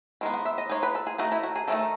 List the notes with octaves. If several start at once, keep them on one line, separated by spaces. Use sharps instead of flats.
D#3 G#3 B3
F#5
E5
D#5
G#3 D#4 C#5
B4
A4
G#4
D#3 A3 D#4 F#4
E4
F#4
G#4
D#3 A3 D#4 A4